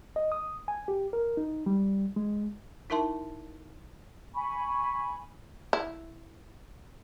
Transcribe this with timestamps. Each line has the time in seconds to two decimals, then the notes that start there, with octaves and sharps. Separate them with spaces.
0.16 D#5
0.32 D#6
0.68 G#5
0.88 G4
1.13 A#4
1.37 D#4
1.66 G3
2.16 G#3
2.90 D#4 E4 A#4 E5 A5 C6
4.35 G#5 B5 C#6
5.73 E4